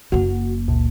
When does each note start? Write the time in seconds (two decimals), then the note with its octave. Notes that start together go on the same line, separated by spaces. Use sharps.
0.12 F#1 A#3 F#4
0.68 C#2 A#2